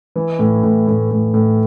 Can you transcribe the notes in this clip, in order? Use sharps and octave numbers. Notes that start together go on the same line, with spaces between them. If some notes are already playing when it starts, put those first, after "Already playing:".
E3
A2
A2
A2
A2
A2